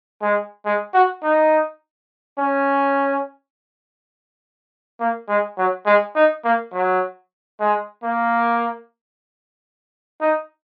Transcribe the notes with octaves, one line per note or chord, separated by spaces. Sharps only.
G#3
G#3
F#4
D#4
C#4
A#3
G#3
F#3
G#3
D#4
A#3
F#3
G#3
A#3
D#4